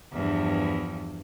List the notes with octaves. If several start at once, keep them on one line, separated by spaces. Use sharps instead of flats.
E2 G2 F3